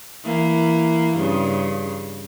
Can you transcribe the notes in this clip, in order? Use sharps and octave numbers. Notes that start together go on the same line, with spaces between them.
E3 A#3
G2 C#3